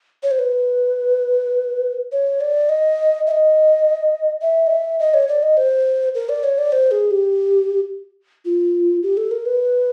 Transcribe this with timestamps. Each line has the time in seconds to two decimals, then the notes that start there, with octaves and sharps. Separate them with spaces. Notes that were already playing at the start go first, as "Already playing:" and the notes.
0.23 C#5
0.31 C5
0.39 B4
2.12 C#5
2.41 D5
2.69 D#5
3.27 E5
3.31 D#5
4.42 E5
4.67 D#5
4.70 E5
5.00 D#5
5.14 C#5
5.29 D5
5.43 D#5
5.57 C5
6.15 A#4
6.29 D5
6.44 C#5
6.58 D5
6.72 C5
6.91 G#4
7.11 G4
8.45 F4
9.03 G4
9.17 A4
9.31 A#4
9.46 B4